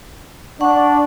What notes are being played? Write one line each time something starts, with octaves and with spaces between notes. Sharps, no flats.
D4 F#5 C#6